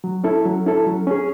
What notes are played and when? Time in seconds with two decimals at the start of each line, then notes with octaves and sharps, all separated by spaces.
0.04 F#3
0.24 C#4 E4 A4
0.45 F#3
0.66 C#4 E4 A4
0.86 F#3
1.07 C#4 G#4